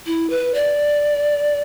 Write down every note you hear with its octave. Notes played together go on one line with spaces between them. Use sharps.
E4
B4
D5